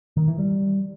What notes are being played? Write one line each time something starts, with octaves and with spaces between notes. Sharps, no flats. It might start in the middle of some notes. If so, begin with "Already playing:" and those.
D#3
E3
G3